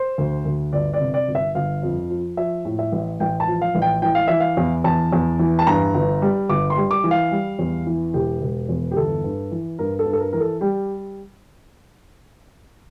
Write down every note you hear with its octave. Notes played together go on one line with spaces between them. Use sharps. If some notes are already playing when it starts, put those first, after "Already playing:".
Already playing: C5
D2
D2
G1 D5
D5
C3
D5
G1
E5
G1 F5
F2
F3
F3 E5
A2
E5
A1
A1 G5
A5
F3
F5
A1
G5
E3 G5
F5
E3 E5
F5
E2
E2 A5
E2
E3
A5
G2 A#5
G1
G3
G1 D6
C6
G3
D6
E3
F5
G3
E2
E3
E1 G4
E1
E2
G4
G1 A4
G2
E3
G2 A#4
A4
G2
A4
A#4
E3 A#4
A4
G3 G4